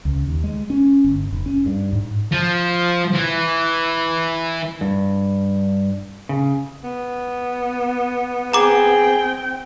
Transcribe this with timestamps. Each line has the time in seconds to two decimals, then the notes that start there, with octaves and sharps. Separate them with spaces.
0.05 C#2
0.27 D#2
0.44 G#3
0.70 C#4
1.04 G1
1.32 F1
1.46 C#4
1.66 G2
1.93 G#2
2.32 F3
3.14 E3
4.81 G2
6.29 C#3
6.84 B3
8.53 C4 G#4 G5 A#5 D6